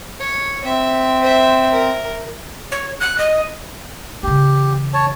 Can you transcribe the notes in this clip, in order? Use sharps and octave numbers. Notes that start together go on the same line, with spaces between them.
C#5
C4 E5
C5 E5
A#4
C#5
F#6
D#5
C#3 E3 G4
C#5 A5